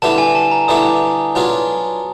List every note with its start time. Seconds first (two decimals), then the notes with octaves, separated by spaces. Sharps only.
0.02 D3 G3 B3 E4 G4 A5
0.18 G#5
0.35 A5
0.51 A#5
0.68 D3 G3 B3 E4 G4 D#6
1.35 F#3 B3 D4 F4 G#4